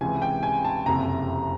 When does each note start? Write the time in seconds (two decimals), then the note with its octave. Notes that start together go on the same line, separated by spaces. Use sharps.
0.01 C#2 C3 E3 G#5
0.22 G5
0.43 G#5
0.65 A5
0.85 F#1 F2 C3 A#5